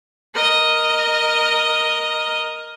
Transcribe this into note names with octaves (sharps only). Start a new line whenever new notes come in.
A#4 D#5